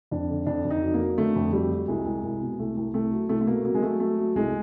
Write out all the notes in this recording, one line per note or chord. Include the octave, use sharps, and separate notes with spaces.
F2 D4
D3
F2 D4
F2
D#4
F#3
A#3
F#3
D3 A3
F2
F#3 G3
F#3
C2 G#3
C2
C2
B2
C2 A3
C2
C2 A3
F#3
C2 A3
A3
B2 A#3
F#3 A#3
G#3
F#3 A3
F#3 A3
F#3
C2 G#3